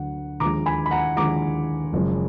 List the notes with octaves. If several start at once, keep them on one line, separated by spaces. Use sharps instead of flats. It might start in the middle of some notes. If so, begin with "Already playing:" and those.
Already playing: D2 D3 F#3 F#5
D#2 D3 F3 G#3 A#5 D6
G#5 B5
B5
F#5 A#5
D#2 D3 F3 G#3 A#5 D6
F#1 F#2 F3 G#3